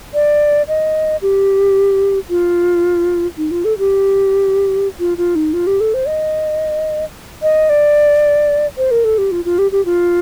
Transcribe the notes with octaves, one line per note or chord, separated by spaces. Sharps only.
D5
D#5
G4
F4
D#4
F4
A4
G4
F4
F4
D#4
F4
G4
A4
C5
D#5
D#5
D5
C5
A#4
A4
G4
F4
F4
G4
G4
F4